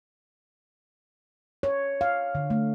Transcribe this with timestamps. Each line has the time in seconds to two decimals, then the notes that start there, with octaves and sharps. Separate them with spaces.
1.63 C#5
2.01 F5
2.35 D3
2.50 A3